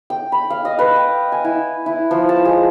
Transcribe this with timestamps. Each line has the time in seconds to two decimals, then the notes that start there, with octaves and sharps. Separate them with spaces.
0.10 G5
0.32 B5
0.50 F5
0.65 D#5
0.79 B4
0.96 G5
1.32 G#5
1.45 E4
1.86 E4
2.11 F3
2.29 A5
2.45 G#3